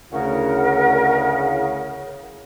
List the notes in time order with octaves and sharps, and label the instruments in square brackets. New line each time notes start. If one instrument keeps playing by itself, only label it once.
[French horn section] D2 E4 [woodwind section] C#3 [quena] A#4 [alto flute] F#5